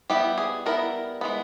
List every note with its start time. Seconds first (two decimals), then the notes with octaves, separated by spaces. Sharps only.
0.10 G3 B3 E4 G4
0.38 G#4
0.66 G3 B3 E4 A#4
1.21 E3 G#3 B3